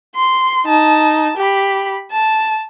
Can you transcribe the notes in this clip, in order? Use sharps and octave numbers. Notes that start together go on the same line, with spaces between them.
C6
D#4 A5
G4 B5
A5